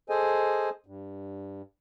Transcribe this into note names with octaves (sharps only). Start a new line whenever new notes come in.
G#4 A4 C5 D#5 G#5
G2